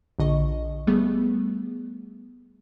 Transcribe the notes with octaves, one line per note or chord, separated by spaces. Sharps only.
A#1 D3 D#5 C#6
G3 A3 B3 G#4